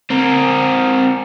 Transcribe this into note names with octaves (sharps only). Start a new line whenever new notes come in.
C4 A#4